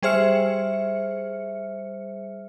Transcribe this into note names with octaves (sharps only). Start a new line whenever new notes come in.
G3 G#4 C5 E5 F6 C#7